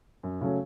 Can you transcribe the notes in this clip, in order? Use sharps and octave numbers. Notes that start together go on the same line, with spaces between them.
F#2
C#3 F#3 A3 C#4